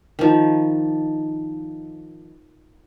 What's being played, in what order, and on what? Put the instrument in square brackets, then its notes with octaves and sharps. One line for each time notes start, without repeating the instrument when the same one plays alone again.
[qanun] D#3 F3